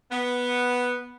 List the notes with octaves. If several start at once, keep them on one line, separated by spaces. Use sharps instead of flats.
B3